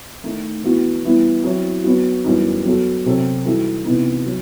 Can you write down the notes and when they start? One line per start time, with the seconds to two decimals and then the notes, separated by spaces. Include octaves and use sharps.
0.24 D#3 A3 D#4
0.64 E3 B3 F#4
1.04 E3 G3 B3 E4
1.44 F#3 C4 E4
1.84 F#3 B3 D#4 F#4
2.25 F#2 E3 G3 B3 D#4
2.65 F#3 B3 F#4 A4
3.06 C3 F#3 C4 F#4 A4
3.45 E3 G3 D#4 F#4 A4
3.85 C3 E3 B3 D#4
4.26 F#3